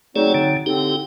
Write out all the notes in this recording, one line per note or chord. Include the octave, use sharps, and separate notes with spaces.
F#3 A3 C4 D#4 G#4 D5
D3
A2 D3 C4 D#4 G4